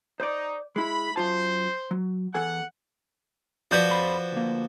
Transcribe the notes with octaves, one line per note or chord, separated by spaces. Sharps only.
D#4 C5 D5
G#3 E4 B5
F#2 F4 C5 A5
F#3
E2 A4 F#5 G#5
F3 F#4 B4 D5 G6
F2 C5 B5
D2 A#3